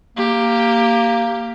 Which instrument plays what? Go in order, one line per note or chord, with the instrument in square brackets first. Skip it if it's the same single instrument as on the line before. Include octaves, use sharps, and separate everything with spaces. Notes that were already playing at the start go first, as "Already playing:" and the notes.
[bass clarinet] A#3 [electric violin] G4